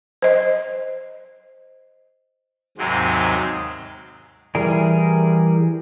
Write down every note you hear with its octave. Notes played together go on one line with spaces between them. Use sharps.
C5 D#5
D#2 G#2 C3 F#3 G#3 C4
E3 G3 G#4 A#4